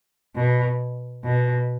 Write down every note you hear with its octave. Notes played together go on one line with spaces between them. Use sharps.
B2
B2